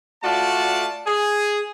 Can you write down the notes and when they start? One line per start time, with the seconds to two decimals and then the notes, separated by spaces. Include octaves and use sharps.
0.23 A3 F4 F#4 D5 A5
1.06 G#4